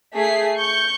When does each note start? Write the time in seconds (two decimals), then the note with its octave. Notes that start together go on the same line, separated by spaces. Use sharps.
0.14 A3 G#4 B6 C7
0.56 C#6 G6